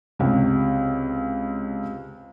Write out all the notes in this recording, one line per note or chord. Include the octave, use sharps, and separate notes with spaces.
C#2 C3